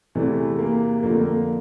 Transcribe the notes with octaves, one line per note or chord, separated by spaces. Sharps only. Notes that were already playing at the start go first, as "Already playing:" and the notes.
E2 C3 E3 A3
A#3
F2 D3 F3 A#3
A3
A#3